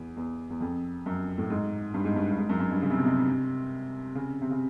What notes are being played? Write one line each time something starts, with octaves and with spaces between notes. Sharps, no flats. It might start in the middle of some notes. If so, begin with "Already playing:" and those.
Already playing: E2
E2
E2
F2
F#2
A2
G#2
G2
G#2
G2
G2
G#2
F#2
F#2
G2
C#3
C3
B2
C3
C#3
C3
C#3